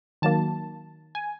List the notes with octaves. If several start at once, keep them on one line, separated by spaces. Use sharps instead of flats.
D#3 F#3 A#3 A5
G#5